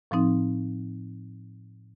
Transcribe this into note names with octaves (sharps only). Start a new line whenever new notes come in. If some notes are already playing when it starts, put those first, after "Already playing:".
A2 F3 C4 D#4